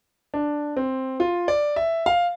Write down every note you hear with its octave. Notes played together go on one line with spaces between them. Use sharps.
D4
C4
F4
D5
E5
F5